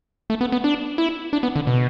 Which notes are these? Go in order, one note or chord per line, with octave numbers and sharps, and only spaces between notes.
A3
B3
B3
D4
E4
D4
B3
D3
B2